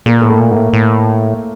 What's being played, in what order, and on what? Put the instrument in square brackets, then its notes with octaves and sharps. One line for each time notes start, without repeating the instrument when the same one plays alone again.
[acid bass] A#2 [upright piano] A#3
[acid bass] A2 [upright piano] A#3
[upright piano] A3
[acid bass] A#2
[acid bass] G#2 [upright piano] A#3
[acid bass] A2
A2